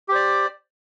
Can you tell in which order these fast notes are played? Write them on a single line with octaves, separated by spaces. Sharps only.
G4 C5 D5